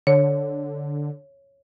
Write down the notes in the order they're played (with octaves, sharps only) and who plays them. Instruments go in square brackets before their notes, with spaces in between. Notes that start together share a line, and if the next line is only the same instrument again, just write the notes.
[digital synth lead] D3 [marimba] C#5